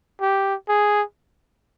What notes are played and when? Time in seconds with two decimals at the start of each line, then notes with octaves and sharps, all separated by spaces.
0.21 G4
0.68 G#4